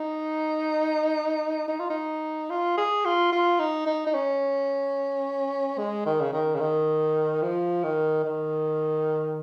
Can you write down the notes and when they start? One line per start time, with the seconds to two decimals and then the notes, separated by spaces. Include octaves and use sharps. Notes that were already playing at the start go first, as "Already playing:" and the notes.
Already playing: D#4
1.68 D#4
1.79 F4
1.90 D#4
2.50 F4
2.77 G#4
3.05 F4
3.32 F4
3.60 D#4
3.86 D#4
4.06 D#4
4.14 C#4
5.78 G#3
6.06 D#3
6.21 C#3
6.33 D#3
6.55 C#3
6.60 D#3
7.42 F3
7.84 D#3
8.24 D#3